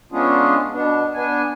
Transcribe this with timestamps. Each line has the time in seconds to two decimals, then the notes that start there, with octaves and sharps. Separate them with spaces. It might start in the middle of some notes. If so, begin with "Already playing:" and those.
0.12 G#3 B3 C#4 D4 F4 G#4
0.72 B2 B3 D4
1.14 B3 D4 G#5